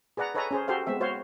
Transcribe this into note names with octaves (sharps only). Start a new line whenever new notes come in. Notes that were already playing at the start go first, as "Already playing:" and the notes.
G#4 B4 D5 F#5 A#5
A4 B4 C#5 D#5 G#5 A#5
C#4 G#4 C5
F#4 G4 A4 C5 F5
G#3 B3 C4 E5
F#4 C5 C#5 F5